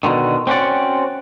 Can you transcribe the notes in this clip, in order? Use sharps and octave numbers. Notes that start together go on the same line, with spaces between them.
B2 D3 D#3
C4 C#4 F#4 D5